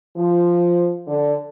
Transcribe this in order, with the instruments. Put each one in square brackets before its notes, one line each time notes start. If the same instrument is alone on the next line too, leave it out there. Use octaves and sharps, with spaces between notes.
[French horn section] F3
D3